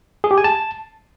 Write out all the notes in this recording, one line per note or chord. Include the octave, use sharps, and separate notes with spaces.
G#4
G4
G#5
A5